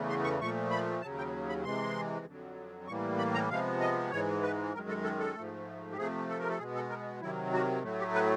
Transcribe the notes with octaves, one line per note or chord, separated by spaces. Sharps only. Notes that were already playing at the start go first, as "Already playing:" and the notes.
Already playing: E2 C#3 E3 A3
C6
C#6
A#2 F3 A3 C#6
B5
D#2 C#3 F#3 A5
G5
B5
C3 E3 G#3 C6
F2 D3 F#3
A2 E3 G3 A#3 C#6
B5
A#5
C3 F3 G#3 B3 F5
D#5
G#2 E3 G#3 C#5
B4
F#2 D#3 G#3 A#4
A4
A4
A4
G#2 F3 A3
G4
C3 F3 A3 G#4
A4
A#4
A4
B2 G#3 B3 G#4
A4
A#4
C3 D#3 F#3 E4
F#4
A2 F#3 A3
G4
B4